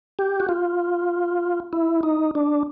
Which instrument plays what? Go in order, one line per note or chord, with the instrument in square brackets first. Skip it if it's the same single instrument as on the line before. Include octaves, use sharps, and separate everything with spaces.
[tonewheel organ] G4
F#4
F4
E4
D#4
D4